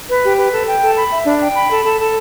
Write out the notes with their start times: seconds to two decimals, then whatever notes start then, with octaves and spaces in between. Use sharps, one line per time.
0.09 B4
0.23 G4
0.38 B4
0.53 A4
0.68 G5
0.81 A4
0.96 B5
1.11 E5
1.26 D4
1.40 G5
1.55 B5
1.70 A4
1.85 A4
1.99 A4